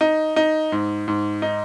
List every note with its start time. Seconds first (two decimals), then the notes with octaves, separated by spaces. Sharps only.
0.01 D#4
0.36 D#4
0.72 G#2
1.08 G#2
1.42 D#4